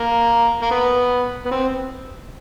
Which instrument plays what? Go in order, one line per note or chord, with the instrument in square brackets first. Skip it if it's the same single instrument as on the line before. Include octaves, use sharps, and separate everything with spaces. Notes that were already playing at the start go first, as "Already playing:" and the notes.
Already playing: [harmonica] A#3
A#3
B3
B3
C4